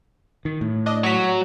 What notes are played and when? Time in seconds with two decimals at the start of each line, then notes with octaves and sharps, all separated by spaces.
0.45 D#3
0.61 A2
0.86 D4 D#5
1.04 F#3 C#6 B6